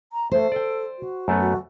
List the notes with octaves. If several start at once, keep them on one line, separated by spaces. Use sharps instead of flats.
A#5
A3 C5
A4 D5 G5
F#4
F#2 A3 B3
F#4